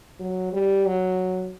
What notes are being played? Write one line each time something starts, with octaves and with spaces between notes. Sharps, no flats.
F#3
G3
F#3